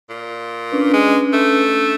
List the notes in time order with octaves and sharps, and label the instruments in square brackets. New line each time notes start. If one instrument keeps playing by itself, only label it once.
[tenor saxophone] A#2
[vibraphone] C#4 D4 B4
[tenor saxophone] G#3
A3